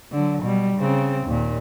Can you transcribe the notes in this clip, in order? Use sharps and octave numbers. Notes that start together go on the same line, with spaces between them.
D3 F#3
B2 G3
C#3 C4
D#2 A#2